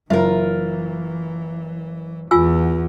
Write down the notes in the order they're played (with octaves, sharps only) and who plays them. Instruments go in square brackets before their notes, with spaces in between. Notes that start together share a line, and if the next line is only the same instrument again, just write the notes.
[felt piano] F#1 [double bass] E3 [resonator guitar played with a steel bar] F4 A#4 [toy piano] E5
[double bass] E2 [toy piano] F4 G#5 E6